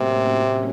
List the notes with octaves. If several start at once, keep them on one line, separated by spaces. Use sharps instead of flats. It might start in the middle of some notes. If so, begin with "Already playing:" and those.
Already playing: A2 C3 F#3 A#3 C#4